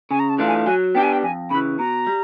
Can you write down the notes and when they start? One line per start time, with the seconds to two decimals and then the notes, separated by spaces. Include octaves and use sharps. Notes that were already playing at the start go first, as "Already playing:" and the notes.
0.11 C#3 G#5
0.20 A#5
0.29 A5
0.38 E3 A3 D4 F4
0.48 G#5
0.66 F#3 G#5
0.95 B3 D4 G4 G5
1.03 G#5
1.13 G5
1.23 F2 G#5
1.50 C#3 E3 B5
1.79 B2 A#5
2.07 G3